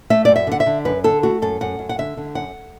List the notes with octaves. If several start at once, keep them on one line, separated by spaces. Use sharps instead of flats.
A3 E5
F#2 D5
E5
D3 F#5
E5
D3
F#2 B4
D3 A4
A3 F#4
F#2 A4
F#2 F#5
F#2
F#5
D3 E5
D3
F#2 F#5